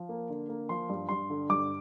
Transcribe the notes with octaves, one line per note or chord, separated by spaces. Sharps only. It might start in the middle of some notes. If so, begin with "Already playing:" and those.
Already playing: F3
A#3
D3
A#3
F3 C6
G2
G2 C6
D3
G2 D6